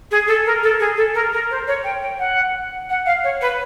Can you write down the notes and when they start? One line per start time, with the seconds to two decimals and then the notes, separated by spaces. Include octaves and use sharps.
0.11 G#4
0.27 A4
0.46 A#4
0.63 A4
0.79 G#4
0.97 A4
1.14 A#4
1.33 A#4
1.50 C5
1.67 C#5
1.84 G5
2.01 G5
2.19 F#5
2.89 F#5
3.06 F5
3.23 C#5
3.41 B4